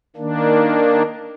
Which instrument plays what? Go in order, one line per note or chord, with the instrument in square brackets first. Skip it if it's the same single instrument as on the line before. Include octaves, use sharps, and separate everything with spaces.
[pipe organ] D#3 A#3 D4